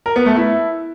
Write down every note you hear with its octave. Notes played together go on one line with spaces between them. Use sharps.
A#4
B3
A3
E4